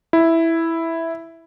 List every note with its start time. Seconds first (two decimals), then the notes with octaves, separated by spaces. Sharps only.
0.13 E4